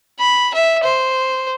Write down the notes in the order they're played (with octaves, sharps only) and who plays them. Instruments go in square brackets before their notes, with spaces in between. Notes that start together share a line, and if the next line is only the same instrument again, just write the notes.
[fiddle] B5
E5
C5